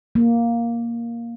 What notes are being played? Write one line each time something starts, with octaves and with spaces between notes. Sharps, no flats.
A#3